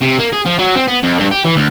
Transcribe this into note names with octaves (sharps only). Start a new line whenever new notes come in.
C3
A#3
G#4
F3
F#3
C4
B3
F2
G2
G4
E3
D2